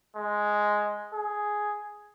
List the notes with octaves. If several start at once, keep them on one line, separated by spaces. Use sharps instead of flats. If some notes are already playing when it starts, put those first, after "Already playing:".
G#3
G#4